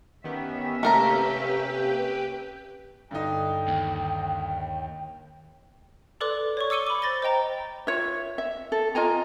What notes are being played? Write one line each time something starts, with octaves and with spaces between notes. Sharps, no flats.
D#3 B3 C#4 G4 E5
C3 A3 A#3 G4 A#4 B4 G5 A#5
G2 D3 D#4 G5
D#2
A4 B4 D5 C6 D6 F#6
C#5 D5 C#6
D6 E6 C#7 D#7 G7
B5 D6
C5 B5 A6 A#6 G7
C5 D#5 G5 A#5
F4 C#5 E5
E5
A4
F4 D#5 G#5 A#5